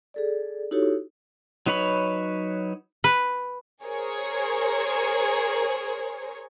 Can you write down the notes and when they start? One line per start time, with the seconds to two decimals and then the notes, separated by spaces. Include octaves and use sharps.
0.14 G#4 A4 D5
0.71 D#4 E4 F#4 G4 A4 C#5
1.66 F#3 D#4 B4 C#5 B5
3.04 B4
3.84 G#4 A#4 C5 C#5